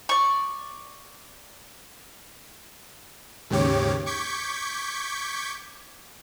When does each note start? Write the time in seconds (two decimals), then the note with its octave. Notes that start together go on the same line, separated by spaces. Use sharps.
0.09 D5 C#6
3.50 D#2 G#2 C#3 G4 C#5 D6
4.06 C#6 D6 G6 G#6 B6 C#7